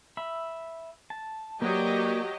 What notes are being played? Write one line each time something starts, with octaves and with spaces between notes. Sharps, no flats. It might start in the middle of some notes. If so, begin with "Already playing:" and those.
E5 B5
A5
F#3 A#3 G4 B4 D5 D#5